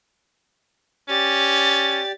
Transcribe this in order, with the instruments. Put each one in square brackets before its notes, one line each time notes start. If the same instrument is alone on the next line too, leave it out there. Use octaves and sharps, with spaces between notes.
[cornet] C#4 [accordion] G4 D5 [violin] A6